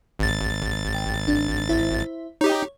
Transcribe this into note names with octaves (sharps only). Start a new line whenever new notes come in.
G#1 A6
G5
D4
E4 C5 E5
D#4 G4 C#5